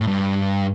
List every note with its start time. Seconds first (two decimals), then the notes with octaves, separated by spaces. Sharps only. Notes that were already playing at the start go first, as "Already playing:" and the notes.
0.01 A2
0.07 G2